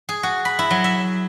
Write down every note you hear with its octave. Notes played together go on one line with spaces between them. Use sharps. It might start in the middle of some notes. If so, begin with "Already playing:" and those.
G#4
F#4
B5
E4
F#3
E5